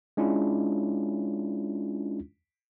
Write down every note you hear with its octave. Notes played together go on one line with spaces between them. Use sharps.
G#3 C#4 D4 E4 F4